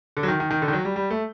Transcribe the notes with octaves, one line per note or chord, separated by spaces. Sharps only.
D3
F#3
D#3
D#3
D#3
D3
D#3
F#3
G3
G3
A3